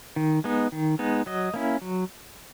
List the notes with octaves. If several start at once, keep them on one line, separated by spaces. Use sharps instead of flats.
D#3
G#3 B3 D#4
D#3
G#3 B3 D#4
F#3 D#5
A#3 C#4 E4
F#3